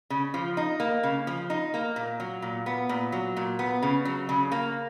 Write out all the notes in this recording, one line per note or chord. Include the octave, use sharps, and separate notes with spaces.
C#3
F3
D#4
A#3
C#3
F3
D#4
A#3
A#2
F#3
A#2
B3
A#2
F#3
A#2
B3
C#3
F#3
C#3
A#3